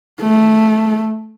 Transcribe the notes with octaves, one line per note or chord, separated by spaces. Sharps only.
A3